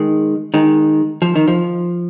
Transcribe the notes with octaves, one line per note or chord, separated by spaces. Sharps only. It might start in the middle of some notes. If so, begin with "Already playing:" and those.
Already playing: D#3 G#3
D#3 G#3
F3
D#3
F3